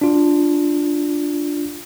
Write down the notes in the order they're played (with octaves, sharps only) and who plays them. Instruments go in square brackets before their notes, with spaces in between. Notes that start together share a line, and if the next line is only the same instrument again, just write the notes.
[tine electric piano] D4 F4